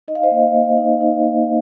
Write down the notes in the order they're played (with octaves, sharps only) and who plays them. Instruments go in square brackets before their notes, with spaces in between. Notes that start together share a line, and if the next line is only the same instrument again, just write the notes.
[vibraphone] D#4 D#5
F5
C5 D#5
A#3
A#3
D#4
D#4
A#3